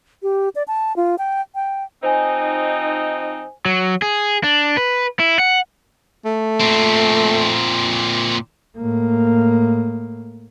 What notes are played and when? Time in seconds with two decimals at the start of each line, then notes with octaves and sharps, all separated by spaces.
0.23 G4
0.55 D5
0.68 A5
0.96 F4
1.18 G5
1.55 G5
2.03 F3 C4 D#4 C5 G#5
3.65 F#3
4.02 G#4
4.44 D4
4.77 B4
5.20 E4
5.40 F#5
6.25 A3
6.60 A#2 C4
8.77 A2 A#3